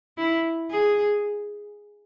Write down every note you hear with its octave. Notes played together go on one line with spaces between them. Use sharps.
E4
G#4